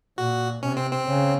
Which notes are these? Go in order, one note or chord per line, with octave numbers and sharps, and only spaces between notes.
A#2 F#4
C3 C#4
C4
C4
C#3